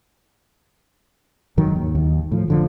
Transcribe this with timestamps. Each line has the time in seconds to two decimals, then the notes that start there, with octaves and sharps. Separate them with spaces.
1.57 F1 G#2 D#3 F#3
1.75 D#2
1.95 D#2 D#3
2.31 A2 F3
2.48 F1 D3 F3